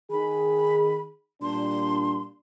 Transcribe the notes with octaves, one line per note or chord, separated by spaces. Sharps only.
D#3 G#4 B5
A#2 G3 D4 C6